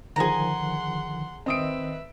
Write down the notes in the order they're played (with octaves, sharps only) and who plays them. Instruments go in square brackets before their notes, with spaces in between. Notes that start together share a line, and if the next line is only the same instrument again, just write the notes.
[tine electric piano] D3 D#3 F3 [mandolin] G#4 A#5 [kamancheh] F#5 C6
[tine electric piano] D#3 D#5 [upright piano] C4 D#6 D7 [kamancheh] B4 E5